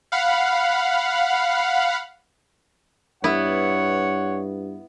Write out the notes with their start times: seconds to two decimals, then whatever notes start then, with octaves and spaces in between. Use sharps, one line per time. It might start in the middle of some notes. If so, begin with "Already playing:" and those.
0.12 F5 F#5 B5
3.24 G2 B3 E4 C#5 F#5